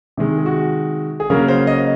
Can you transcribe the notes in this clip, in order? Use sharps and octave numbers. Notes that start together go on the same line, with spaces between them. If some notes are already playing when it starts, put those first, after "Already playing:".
C3 D#3 G#3
G#4
F#4
G#4
C#3 F#3 A#3 A#4
C5
D#5